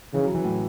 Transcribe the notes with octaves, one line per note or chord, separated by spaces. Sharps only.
C#3 E3
F#3
E3
A2